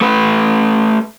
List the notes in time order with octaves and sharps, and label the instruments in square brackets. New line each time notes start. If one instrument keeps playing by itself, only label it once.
[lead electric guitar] A3 B4